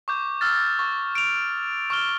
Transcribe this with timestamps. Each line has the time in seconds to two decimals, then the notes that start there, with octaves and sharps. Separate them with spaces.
0.08 C#6 D6 G6
0.41 E6 F6 A6
0.79 C#6
1.15 D7 F7
1.90 C#6 F6 G7